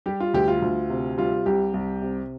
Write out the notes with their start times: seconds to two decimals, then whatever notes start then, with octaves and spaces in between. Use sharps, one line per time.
0.06 G3 G4
0.20 F4
0.34 D2 G4
0.48 F4
0.62 D2
0.90 C3
1.18 G3 F4
1.46 C2 G4
1.74 C2
2.02 C3